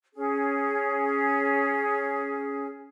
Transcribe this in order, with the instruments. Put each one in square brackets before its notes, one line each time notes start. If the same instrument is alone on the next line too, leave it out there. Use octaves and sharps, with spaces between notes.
[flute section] C#4 G#4